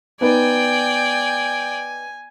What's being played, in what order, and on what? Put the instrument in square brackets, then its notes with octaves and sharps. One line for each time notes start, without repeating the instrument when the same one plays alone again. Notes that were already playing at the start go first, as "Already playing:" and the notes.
[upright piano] B3 D#4 B4 [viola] D5 G5 [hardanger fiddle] G#5